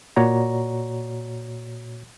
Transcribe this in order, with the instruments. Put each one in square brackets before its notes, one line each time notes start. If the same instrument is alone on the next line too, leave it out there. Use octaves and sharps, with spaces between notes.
[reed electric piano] A#2 F#4 C#5 D5 A#5